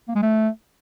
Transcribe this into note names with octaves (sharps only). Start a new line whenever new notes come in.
A#3
G#3
A3